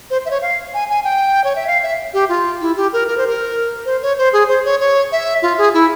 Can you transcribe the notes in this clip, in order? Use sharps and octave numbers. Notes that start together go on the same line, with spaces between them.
C5
E5
C#5
F5
G#5
G#5
G5
C#5
E5
F5
E5
G4
F4
E4
G4
A#4
A#4
C5
A#4
C5
C#5
C5
G#4
C5
C#5
C#5
E5
F4
G#4
E4